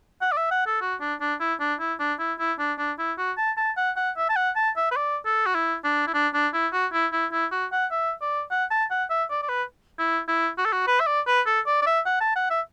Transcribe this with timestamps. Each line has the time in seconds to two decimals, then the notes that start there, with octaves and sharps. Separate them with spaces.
0.22 F#5
0.32 D5
0.37 E5
0.51 F#5
0.66 A4
0.81 F#4
1.00 D4
1.21 D4
1.40 E4
1.60 D4
1.80 E4
2.00 D4
2.19 E4
2.39 E4
2.59 D4
2.78 D4
2.99 E4
3.18 F#4
3.37 A5
3.57 A5
3.77 F#5
3.96 F#5
4.17 E5
4.29 A5
4.36 F#5
4.56 A5
4.76 E5
4.91 B4
4.96 D5
5.26 A4
5.46 F#4
5.55 E4
5.84 D4
6.07 E4
6.14 D4
6.34 D4
6.54 E4
6.73 F#4
6.93 E4
7.12 E4
7.32 E4
7.52 F#4
7.72 F#5
7.91 E5
8.21 D5
8.51 F#5
8.71 A5
8.90 F#5
9.10 E5
9.30 D5
9.43 D5
9.49 B4
9.99 E4
10.28 E4
10.58 F#4
10.65 A4
10.73 F#4
10.87 B4
11.00 E5
11.07 D5
11.27 B4
11.46 A4
11.66 D5
11.82 D5
11.86 E5
12.06 F#5
12.20 A5
12.36 F#5
12.50 E5